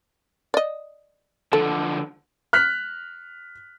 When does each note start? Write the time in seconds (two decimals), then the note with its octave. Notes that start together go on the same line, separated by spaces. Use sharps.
0.54 D5 D#5
1.53 D3 F3 A4
2.53 F6 F#6 B6